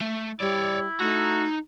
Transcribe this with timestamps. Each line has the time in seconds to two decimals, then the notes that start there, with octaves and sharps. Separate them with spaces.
0.01 A3
0.40 G3 E4 C#5 D5
1.00 A3 D#4 F#4 A#5